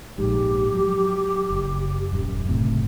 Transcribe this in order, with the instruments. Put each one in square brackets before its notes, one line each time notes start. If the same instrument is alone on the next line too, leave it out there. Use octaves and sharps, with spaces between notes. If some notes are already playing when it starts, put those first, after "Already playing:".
[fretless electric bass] A#1 G#2 [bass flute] G4
[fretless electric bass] F#3
F#1
D#1 F#2
F#1 A2 C3